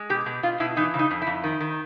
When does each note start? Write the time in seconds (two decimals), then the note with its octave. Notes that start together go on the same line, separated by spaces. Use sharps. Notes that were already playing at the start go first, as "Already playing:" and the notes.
Already playing: G#3
0.10 B2 G4
0.26 B2
0.43 B2 F4
0.60 B2 E4
0.77 E3 D#4
0.94 C#3
0.99 D#4
1.11 F2
1.22 E4
1.27 F2
1.44 D#3
1.60 D#3